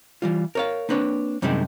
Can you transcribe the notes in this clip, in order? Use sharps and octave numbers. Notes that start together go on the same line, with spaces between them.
E3 G3 F4
A#4 C#5 F5
A#3 C4 D4 B4 C#5
F#2 C3 D#3 G3 G#3 D4